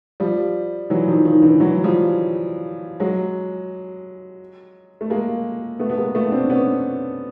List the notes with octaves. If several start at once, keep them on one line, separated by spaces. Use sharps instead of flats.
F3 G3
E3 F#3
D#3 F3
D#3
D3 E3
E3 F#3
F3 G3
F#3 G#3
A3
G#3 A#3
A3 B3
B3
G#3 A#3
A3 B3
C4 D4
B3 C#4